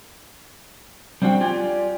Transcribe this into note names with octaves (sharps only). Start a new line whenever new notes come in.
G3 A#3 C4 D4 F#4 G5
F4 G4 D5 G#5